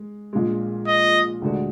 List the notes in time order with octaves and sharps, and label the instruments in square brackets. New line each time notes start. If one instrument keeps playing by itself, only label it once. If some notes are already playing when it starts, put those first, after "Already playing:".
Already playing: [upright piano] G#3
A#1 A#2 G#3
[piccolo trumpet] D#5
[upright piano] D2 D3 G#3 D4 F#4